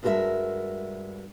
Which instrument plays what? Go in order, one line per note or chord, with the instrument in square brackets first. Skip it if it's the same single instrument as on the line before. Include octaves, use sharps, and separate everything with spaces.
[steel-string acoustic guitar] G2 G#3 F#4 A4 A#4 E5